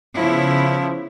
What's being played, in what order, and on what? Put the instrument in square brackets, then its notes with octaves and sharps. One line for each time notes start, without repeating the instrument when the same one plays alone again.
[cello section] C#3 B3 E4 [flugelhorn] F3